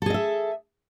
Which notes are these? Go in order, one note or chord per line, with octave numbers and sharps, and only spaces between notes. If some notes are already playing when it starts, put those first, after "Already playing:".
G#4 A4 D#5 E5